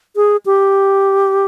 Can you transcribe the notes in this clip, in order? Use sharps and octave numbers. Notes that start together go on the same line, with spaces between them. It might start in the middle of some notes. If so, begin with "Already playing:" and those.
G#4
G4